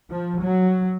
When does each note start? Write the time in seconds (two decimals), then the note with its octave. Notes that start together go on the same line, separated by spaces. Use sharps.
0.11 F3
0.43 F#3